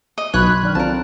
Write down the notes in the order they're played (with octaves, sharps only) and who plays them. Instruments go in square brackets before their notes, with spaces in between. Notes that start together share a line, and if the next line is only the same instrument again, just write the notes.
[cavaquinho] D#5
[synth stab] B1 F#6 [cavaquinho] C#5 B5
[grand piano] C6
D#3 D4 F6
[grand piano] C4 F4 A4 [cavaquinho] A#4 A5